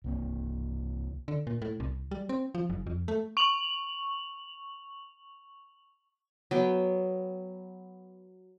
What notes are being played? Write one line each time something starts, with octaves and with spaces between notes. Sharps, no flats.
C2 A#3 C4
D3
A#2
A2
C2
G3
C4
F3
F#1
F2
A3
C#6 F7 F#7
F#3 B3 G5